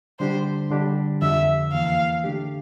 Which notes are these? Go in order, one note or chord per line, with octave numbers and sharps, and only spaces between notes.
D3 G3 D4 G4 C5
D3 G3 D4 G4
F2 D3 F3 E5
E2 E3 A#3 F5
D3 A3 D4 G4